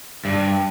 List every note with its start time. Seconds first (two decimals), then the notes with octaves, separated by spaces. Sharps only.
0.25 G2